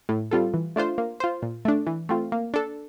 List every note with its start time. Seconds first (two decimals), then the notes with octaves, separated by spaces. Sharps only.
0.09 A2
0.31 G3 C4 F4 A4
0.54 E3
0.76 A3 D4 F4 C5
0.98 A#3
1.20 F4 C5
1.42 A#2
1.65 A3 D4
1.87 E3
2.09 A3 C4 F4
2.32 A#3
2.54 D4 A4